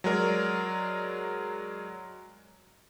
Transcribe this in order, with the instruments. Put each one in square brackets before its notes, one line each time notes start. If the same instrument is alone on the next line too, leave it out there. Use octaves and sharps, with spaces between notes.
[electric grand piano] F#3 G#3 A#4 D5